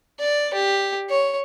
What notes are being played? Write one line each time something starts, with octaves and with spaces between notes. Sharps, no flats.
D5
G4
C#5